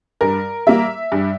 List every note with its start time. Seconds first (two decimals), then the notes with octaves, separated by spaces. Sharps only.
0.21 G2 A#4
0.67 G3 A#3 E5
1.12 G2